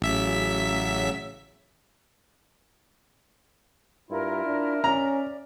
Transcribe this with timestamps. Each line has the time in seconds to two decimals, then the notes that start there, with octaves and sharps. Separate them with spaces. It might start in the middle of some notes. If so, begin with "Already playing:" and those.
0.02 A1 C#3 F#3 E5 B6
4.10 G2 E4 F4 A#4 E5
4.46 D4
4.84 C#4 D5 A#5